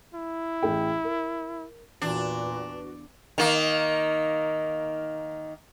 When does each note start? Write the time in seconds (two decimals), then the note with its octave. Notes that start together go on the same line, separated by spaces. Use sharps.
0.15 E4
0.63 A1 G#4 G5
1.04 A#4
2.02 E2 A#2 D4 F#4 B4
3.38 D#3 A#3